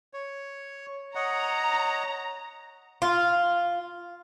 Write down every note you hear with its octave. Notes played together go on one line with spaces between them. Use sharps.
C#5
C#5 D#5 F#5 A#5
F4